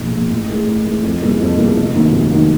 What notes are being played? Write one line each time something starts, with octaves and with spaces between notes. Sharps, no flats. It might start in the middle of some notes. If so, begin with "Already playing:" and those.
Already playing: B1 A#2 F3 G#3
A#2 F3 G#3
A1
A2 E3 G#3
A1
A2 E3 G#3
F2
C#3 E3 G3 A#3
F2
C#3 E3 G3 A#3
F1
D#2 D#3 F#3
F1
D#2 D#3 F#3